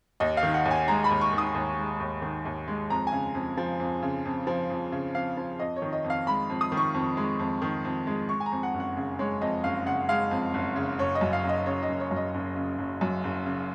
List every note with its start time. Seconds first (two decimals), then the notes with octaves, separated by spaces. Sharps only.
0.20 D#2 D#5
0.37 F5
0.43 D#3
0.54 F#5
0.65 D#2
0.71 G#5
0.88 G#3 A#5
1.04 B5
1.10 D#2
1.21 C#6
1.33 D#3
1.38 D#6
1.55 D#2
1.78 G#3
2.00 D#2
2.22 D#3
2.45 D#2
2.68 G#3
2.90 F2 A#5
3.07 G#5
3.12 C#3
3.35 F2
3.57 F3
3.80 F2
4.03 C#3
4.25 F2
4.47 F3
4.70 F2
4.92 C#3
5.14 F2 F5
5.37 F3
5.59 F2 D#5
5.76 C#5
5.82 D#3
5.93 D#5
6.04 F2
6.10 F5
6.27 G#3 B5
6.50 F2
6.61 D#6
6.72 D#3
6.77 C#6
6.94 F2
7.17 G#3
7.39 F2
7.62 D#3
7.85 F2
8.07 G#3
8.29 G#3 C#6
8.40 G#5
8.46 A#5
8.52 F2
8.63 F#5
8.74 F#1
8.80 F#5
8.97 C#3
9.19 G#3 C#5
9.41 F2 D#5
9.64 F#1 F5
9.86 C#3 F#5
10.09 G#3 F5
10.31 F2
10.54 F#1
10.76 C#3
10.99 F#1 C#5
11.15 D#5
11.21 F#2
11.33 F5
11.44 F#1
11.49 D#5
11.66 C#3 C#5
11.83 D#5
11.88 F#1
12.00 C#5
12.11 F#2
12.16 D#5
12.34 F#1
12.56 C#3
12.78 F#1
13.01 F#2
13.24 F#1
13.46 C#3